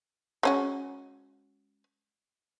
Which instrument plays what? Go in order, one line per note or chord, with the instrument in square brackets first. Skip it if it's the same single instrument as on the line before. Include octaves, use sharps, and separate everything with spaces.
[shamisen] G#3 C#4 F#4